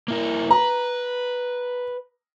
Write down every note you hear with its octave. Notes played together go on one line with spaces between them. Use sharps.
A#3 E4 A#4
B4 A#5